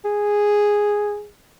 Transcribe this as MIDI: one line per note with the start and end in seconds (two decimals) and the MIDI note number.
0.05 1.27 68